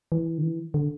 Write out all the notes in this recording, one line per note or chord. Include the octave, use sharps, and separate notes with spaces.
E3
D3
E3
D3